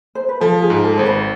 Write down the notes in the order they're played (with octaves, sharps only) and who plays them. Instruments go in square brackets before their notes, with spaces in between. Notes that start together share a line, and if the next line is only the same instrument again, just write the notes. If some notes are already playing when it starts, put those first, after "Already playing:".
[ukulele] C5
B4
[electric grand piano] F3 [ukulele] A4
[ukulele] G#4
[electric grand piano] G#2
[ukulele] A4
[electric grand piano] G#1 [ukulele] C5
[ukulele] B4